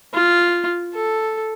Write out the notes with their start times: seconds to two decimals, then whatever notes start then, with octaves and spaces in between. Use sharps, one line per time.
0.14 F4
0.94 A4